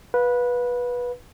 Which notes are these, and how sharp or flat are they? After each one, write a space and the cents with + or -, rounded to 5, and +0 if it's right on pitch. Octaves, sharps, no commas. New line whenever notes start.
B4 -15 F5 +30